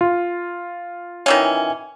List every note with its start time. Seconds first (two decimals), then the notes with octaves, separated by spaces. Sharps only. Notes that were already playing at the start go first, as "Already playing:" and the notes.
0.01 F4
1.26 D#3 E3 C#4